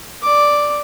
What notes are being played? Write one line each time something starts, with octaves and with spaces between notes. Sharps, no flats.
D5 D6